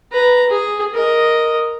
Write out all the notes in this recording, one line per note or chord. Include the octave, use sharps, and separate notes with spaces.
B4 A#5
G#4
A#4 D#5